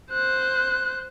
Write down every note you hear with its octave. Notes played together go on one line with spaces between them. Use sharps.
C5 F#6